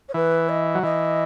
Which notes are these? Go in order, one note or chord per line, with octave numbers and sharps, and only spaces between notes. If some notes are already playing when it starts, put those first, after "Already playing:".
C#5
E3 B4
D#5
F#3
E3 D#5